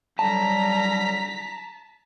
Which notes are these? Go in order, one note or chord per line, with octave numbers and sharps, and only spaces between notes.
D3 F#3 G3 A5 A#5 B6